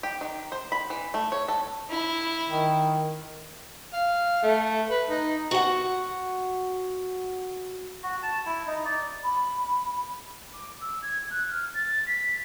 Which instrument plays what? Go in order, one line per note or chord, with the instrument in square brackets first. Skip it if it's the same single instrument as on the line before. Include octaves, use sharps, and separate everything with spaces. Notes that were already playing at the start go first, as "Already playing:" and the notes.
[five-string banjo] G4
D#3
C5
B5
E3
A3
C#5
A4
[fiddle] E4
[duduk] D#3
[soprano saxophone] F5
A3
B4
D#4
[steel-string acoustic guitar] F#4 F#5
[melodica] F#4
A5
E4
D#4
D5
[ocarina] B5
[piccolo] D6
E6
G#6
F#6
F6
A6
B6